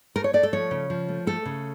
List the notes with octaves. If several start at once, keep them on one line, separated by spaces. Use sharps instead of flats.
A3 A#4
C#5
A3 D5
A4
F3 C#5
C#3
F3
A3
A3 A4
C#3